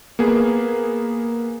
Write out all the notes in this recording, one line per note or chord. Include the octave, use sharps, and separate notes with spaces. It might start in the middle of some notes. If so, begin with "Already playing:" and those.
A#3 B3 G#4